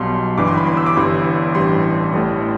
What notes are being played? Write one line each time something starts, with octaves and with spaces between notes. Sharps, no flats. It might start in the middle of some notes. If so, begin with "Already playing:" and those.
Already playing: B1 B2 G3 C6
G1 G2 E3 G3 D6
C6
B5
C6
E6
D6
G1 G2 E3 G3 C6
A1 G2 E3 G3 C6
A1 A2 G3